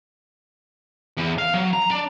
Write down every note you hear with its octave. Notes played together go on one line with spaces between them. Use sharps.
E2
F5
F#3
A#5
D4